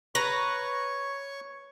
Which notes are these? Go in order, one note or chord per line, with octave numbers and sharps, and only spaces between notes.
B4 C#5 A#5 C#6